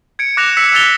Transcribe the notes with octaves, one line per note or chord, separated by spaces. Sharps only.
G#6 C#7 D7
D6 F#6 A#6 C#7 E7 F7
E6 B6 C#7
E6 A6 B6 F7 G7